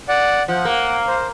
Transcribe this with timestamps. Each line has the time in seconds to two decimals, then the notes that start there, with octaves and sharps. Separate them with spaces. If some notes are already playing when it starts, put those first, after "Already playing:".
0.08 D5 F#5
0.48 F3 F#5
0.65 A#3
1.07 C5